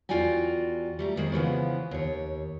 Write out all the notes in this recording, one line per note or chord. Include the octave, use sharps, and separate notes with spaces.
E2 F4 F#4 D5 G5 G#5
G3 A3 A#5
D3 D#3 G#3 C4
C#3 E3 F3 B3
D#2 C#5